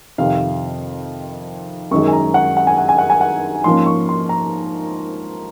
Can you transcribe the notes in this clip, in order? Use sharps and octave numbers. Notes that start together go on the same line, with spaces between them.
F2 C3 D#3 F5
F#2 D#3 G#3 C#6
G#5
A#5
F#5
F#5
G#5
F#5
G#5
F#5
G#5
F#5
G#2 F3 A#3 C#4 C6
C#6
C6
A#5